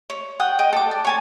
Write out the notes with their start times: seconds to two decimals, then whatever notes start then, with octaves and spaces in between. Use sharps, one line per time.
0.10 C#5
0.40 F#5 G5 D#6
0.59 G#4 D#5 G5 D#6
0.73 A4 D6
0.91 D5
1.05 C#5 G#5 A5